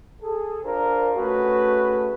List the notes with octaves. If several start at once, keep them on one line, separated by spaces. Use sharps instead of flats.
G#4 A4
D4 F4 A#4 C5
A3 C#4 F#4 G#4 B4